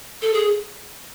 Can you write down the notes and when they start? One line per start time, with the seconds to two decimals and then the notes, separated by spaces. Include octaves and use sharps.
0.22 A4
0.33 G#4